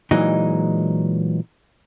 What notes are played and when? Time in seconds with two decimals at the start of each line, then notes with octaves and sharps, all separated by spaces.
0.11 A#2 E3 F#3 G#3 D#4